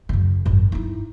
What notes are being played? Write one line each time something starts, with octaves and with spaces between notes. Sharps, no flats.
F#2 C#3
G#1 F#2
D#4 E4